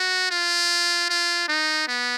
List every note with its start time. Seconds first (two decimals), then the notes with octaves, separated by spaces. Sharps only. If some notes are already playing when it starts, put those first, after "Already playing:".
Already playing: F#4
0.31 F4
1.09 F4
1.48 D#4
1.88 B3